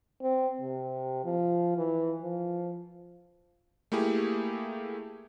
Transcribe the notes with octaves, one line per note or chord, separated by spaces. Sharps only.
C4
C3
F3
E3
F3
A3 A#3 E4 G4 G#4